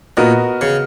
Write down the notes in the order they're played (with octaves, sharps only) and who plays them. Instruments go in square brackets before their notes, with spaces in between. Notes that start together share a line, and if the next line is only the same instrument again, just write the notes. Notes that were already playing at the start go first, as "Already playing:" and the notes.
[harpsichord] A#2 [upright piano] B3 F#4 A#4 D#5
[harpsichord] C#3